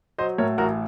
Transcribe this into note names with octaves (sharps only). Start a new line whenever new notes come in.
F#3 C5 D#5
A2 A#4 C#5
A1 F#4 A#4